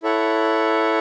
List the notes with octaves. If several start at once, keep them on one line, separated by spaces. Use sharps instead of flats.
E4 A4 C#5 F#5